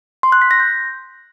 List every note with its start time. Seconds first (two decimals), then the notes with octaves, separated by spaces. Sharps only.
0.23 C6
0.32 F#6
0.42 B6
0.51 A#6
0.60 G6